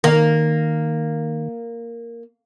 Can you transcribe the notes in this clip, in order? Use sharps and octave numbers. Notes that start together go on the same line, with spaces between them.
D#3 A#3